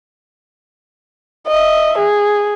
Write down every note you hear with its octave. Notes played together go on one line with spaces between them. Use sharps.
D#5 E5
G#4